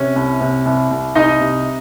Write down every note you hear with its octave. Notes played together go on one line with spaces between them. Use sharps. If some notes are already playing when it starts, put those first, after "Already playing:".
Already playing: C3 C#4
C2
C3
C2
C2
C2 D#4 D#5
C3